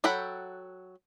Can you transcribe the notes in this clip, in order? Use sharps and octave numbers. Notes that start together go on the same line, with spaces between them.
F#3 A4 F#5 G5 B5